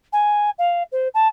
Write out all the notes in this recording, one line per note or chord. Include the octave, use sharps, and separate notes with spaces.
G#5
F5
C5
A5